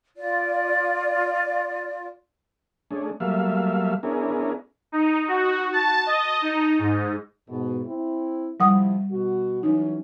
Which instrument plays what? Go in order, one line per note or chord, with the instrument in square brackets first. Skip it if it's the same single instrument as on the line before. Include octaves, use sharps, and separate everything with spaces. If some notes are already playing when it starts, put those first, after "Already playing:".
[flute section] F4 D5
[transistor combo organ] A3 C#4 D4 G#4
F#3 G3 A3 A#3 E5 F5
B3 C#4 D4 E4 G#4 A#4
[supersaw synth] D#4
F#4
A5
D#5
D#4
G#2
[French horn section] G#2 B2
C4 E4
[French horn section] C3 F3 E4 [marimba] G3 F#5 D#6
[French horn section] B2 F#4
[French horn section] E3 F#3 C#4 [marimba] D#4